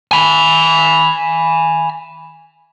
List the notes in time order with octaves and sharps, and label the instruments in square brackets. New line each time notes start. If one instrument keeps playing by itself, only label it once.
[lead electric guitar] G#5 B5